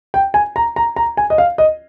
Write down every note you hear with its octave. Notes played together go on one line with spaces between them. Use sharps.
G5
G#5
A#5
A#5
A#5
G#5
D#5
F5
D#5